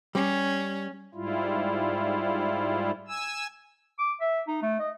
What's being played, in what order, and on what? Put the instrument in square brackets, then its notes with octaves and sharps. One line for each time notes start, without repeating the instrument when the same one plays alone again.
[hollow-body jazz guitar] G3 [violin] C#4
[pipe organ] G#2 G3 E4 F4
G#5 E6
[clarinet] D6
E5
D#4
A3
D#5